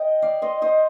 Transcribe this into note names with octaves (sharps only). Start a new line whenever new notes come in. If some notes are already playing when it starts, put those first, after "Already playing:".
Already playing: D#5 G5
D5 F5
C5 D#5
C5 D#5